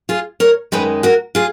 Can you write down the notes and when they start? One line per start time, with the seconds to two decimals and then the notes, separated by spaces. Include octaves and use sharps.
0.09 F4 G#4
0.40 A#4 C#5
0.72 F#2 D#3 G#3 G#4 B4
1.03 F#4 A#4
1.35 F4 G#4